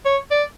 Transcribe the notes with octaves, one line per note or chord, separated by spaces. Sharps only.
C#5
D5